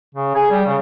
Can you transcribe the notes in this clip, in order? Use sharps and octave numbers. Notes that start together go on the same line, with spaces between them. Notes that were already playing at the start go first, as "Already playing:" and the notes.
C#3
G#4
G3
C#3